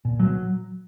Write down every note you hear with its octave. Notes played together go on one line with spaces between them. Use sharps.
A#2
F#3